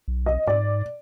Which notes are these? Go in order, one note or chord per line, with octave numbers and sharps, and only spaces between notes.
B1
D#5
G#2 D5